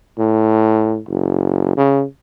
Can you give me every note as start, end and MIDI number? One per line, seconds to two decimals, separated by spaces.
0.19 1.00 45
1.08 1.76 30
1.77 2.04 49